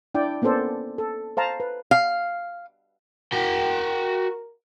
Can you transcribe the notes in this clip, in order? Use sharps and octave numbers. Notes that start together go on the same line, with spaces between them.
D4 E4 D5 G5
A#3 B3 C#4 A4 C5 D5
A4
C5 F5 A5 A#5
B4
F5
F#4 A#4 G5